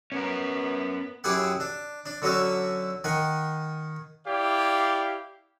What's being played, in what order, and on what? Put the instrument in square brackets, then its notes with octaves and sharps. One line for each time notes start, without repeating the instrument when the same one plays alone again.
[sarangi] B3 [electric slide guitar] C#4 A#4
[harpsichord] F#2 E4 G4 G#4 F#5
D4
D4
D3 F#3 C#4 F#4 E5
D#3 F#5 G#5
[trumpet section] E4 G4 D5 F5